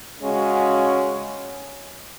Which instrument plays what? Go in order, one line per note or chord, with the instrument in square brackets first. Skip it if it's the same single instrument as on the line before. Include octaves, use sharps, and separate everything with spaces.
[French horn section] C#3 G#3 C#4 F#4